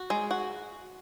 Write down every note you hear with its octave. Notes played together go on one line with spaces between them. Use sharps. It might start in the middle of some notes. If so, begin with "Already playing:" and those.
Already playing: F#4
G#3
F#4